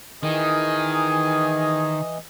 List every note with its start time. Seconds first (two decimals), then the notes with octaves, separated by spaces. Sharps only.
0.23 D#3 E3 G#4 D#5